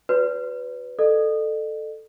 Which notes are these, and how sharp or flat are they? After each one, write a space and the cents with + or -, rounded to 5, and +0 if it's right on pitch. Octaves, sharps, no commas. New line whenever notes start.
F#4 +0 B4 +10 D5 -45
A4 +0 D#5 -45